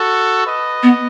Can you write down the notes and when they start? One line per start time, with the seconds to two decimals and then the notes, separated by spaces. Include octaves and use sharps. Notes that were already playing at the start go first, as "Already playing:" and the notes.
Already playing: F#4 A4
0.46 B4 D#5
0.83 B3